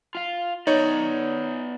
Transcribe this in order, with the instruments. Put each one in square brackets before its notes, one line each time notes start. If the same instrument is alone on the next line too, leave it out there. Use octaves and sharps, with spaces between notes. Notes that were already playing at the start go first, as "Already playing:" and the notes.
[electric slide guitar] F4 F5
[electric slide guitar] B3 D5 [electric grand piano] D#4 C#5